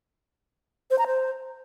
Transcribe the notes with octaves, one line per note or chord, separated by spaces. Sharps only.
C5
A#5
C5